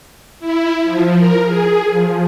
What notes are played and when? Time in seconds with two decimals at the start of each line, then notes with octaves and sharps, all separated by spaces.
0.40 E4
0.84 F3
1.16 A#4
1.45 G#4
1.91 F3